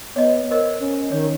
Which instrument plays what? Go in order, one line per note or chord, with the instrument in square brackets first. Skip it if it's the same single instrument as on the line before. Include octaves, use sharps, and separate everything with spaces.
[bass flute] B3 [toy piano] C#5 D#5
[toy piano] A#4 C5 D#5 [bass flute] C#5
[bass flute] C#4
[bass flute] D#3 [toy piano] C#5